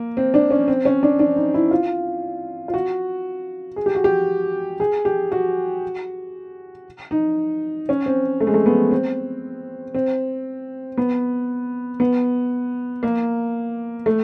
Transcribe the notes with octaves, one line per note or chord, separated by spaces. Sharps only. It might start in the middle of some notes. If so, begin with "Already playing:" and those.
Already playing: A#3
C4
D4
C#4
C4
C#4
D4
D4
D#4
E4
F4
F4
F#4
G#4
G4
F#4
G4
G#4
G4
F#4
D#4
C#4
C4
A3
G#3
A3
B3
C4
C4
B3
B3
A#3
A3